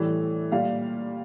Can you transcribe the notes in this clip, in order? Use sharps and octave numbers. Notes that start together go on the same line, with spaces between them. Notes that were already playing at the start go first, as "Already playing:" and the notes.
Already playing: A2 E3 G3
A#2 G3 F5